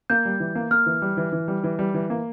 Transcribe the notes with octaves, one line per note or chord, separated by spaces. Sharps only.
A#3 G6
G3
E3
A#3
A#3 F6
E3
G3
E3
E3
G3
E3
G3
E3
A#3